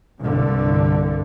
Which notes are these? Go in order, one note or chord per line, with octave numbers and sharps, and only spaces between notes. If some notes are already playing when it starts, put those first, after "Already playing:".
C2 G2 D3